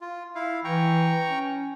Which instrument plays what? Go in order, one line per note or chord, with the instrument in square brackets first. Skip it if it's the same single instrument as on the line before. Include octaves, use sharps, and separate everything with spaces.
[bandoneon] F4
E4 F5
[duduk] E3 [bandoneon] G5 A#5 C#6
[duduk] C#4